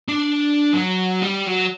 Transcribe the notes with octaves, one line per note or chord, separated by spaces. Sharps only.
D4
F#3
G3
F#3